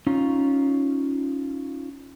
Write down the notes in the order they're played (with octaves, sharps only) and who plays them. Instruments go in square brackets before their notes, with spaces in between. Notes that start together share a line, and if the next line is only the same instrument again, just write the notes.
[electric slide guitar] C#4 D#4 F4 A#5